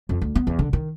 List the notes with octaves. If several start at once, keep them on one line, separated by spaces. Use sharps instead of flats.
F2
D2
B3
E2
D3
D#3